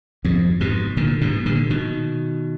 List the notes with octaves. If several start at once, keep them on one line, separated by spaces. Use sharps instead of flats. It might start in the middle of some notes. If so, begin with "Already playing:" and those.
F2 G#2
G#2 B2
A#2 D3
G#2 B2
A#2 D3
B2 D#3